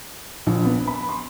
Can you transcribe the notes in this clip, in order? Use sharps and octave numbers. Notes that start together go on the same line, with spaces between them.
A#1
B3
B5
C6